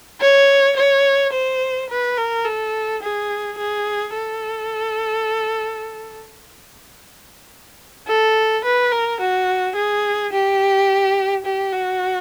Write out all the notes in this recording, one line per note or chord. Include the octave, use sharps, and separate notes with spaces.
C#5
C#5
C5
B4
A#4
A4
G#4
G#4
A4
A4
B4
A#4
F#4
G#4
G4
G4
F#4